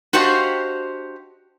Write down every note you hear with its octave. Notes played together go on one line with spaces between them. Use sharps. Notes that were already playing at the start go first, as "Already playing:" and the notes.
D4 F#4 G4 C5 D#5 F5